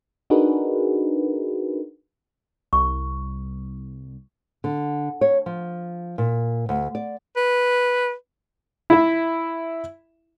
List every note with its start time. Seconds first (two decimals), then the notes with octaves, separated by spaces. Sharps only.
0.30 D4 D#4 F#4 G#4 A#4 B4
2.73 C2 C#6
4.64 D3
5.21 C#5
5.46 F3
6.18 A#2
6.69 D2
6.95 D5
7.36 B4
8.90 E4 E5